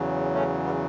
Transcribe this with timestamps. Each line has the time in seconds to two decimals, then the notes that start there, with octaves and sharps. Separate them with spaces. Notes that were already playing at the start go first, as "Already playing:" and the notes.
Already playing: E2 C#3 F#3
0.34 A3 C#4
0.65 G3 B3